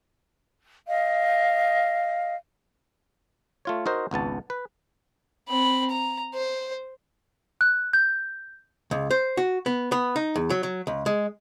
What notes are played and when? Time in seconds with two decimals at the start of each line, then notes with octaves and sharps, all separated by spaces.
0.87 D#5 F5
3.65 A3 F4 C#5
3.86 D#4 F#4 A#4 C5 D#5
4.11 G#1 C#2 B3 A5
4.50 B4
5.49 C4 B5
5.90 A#5
6.34 C5
7.61 F#6
7.93 G6
8.91 C#2
9.11 C5
9.37 F#4
9.66 B3
9.92 B3
10.16 D#4
10.36 E2
10.50 F#3
10.63 F#3
10.87 C#2
11.06 G#3